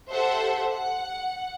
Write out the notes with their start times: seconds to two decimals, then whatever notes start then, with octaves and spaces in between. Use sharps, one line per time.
0.12 G4 A4 C5 E5 F#5 C6
0.70 F#5